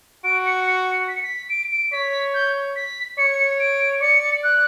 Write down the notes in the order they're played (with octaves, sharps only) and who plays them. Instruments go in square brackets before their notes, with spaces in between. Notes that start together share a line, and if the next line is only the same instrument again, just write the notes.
[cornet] F#4 [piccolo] D7
[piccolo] C#7
C#7
B6
C#7
B6
D7
D7
[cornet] C#5 [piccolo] B6
[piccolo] G6
B6
[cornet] C#5 [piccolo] C#7
[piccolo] D7
[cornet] D5 [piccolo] C#7
[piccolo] F#6